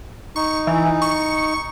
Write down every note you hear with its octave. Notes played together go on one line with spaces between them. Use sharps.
D#4 C#6
E3
C#6